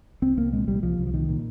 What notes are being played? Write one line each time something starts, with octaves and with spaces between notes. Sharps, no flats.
C2 C4
C2 A#3
A#2 G#3
C2 G3
C2 F3
C2
F3
A#2 D#3
A#2